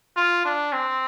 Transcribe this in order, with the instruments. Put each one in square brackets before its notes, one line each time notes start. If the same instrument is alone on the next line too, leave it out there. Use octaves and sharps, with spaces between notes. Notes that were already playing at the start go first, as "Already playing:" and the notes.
[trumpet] F4
D4
C4